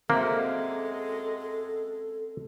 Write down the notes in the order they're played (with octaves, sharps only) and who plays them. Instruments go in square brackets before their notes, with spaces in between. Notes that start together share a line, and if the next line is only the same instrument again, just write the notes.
[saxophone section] F#2 G#3 [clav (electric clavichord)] A#3 [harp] C4 E5 F#5 [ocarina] A4